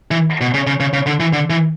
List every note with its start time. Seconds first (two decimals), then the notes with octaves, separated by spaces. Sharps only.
0.11 E3
0.41 B2
0.54 C#3
0.67 C#3
0.80 C#3
0.93 C#3
1.06 D3
1.20 E3
1.33 D3
1.50 E3